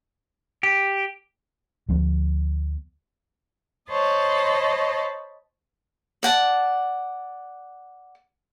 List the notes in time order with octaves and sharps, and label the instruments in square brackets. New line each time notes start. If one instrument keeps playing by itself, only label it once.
[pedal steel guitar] G4
[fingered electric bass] D2 F3 A3 B3
[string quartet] C5 C#5 D#5 A5 B5
[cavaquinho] D5 F#5 A5